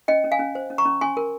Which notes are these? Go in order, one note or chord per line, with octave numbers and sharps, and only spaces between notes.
C#4 D#5 G5
C#4
F5 G#5
C#4
C5
C#4
A#5 C#6
C#4
C#4 G#5 C6
A#4